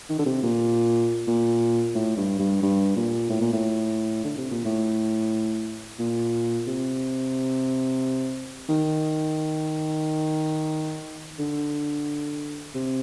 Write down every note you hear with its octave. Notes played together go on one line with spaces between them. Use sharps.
D#3
D3
C3
A#2
A#2
A2
G2
G2
G2
A#2
A2
A#2
A2
D3
C3
A#2
A2
A#2
C3
D#3
D3
C3